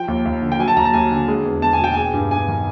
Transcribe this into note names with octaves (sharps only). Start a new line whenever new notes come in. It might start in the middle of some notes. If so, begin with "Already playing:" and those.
Already playing: F3 G5
D#2
D#2
D3
G5
F#3 G#5
A5
D#2 A#5
A5
D#2 G#5
D3
G#3
E2
E2 A5
G#5
B2 G5
G#3 G#5
G2
G2 G#5
D#3